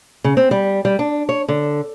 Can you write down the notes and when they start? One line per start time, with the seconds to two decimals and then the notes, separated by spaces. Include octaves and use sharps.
0.24 C#3
0.37 C4
0.51 G3
0.85 G3
0.99 D4
1.29 C#5
1.48 D3